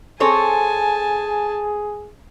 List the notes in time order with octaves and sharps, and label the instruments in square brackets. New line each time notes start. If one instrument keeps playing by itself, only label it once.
[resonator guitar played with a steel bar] C4 A4 C#5 [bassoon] G#4 [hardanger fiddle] G#5 A5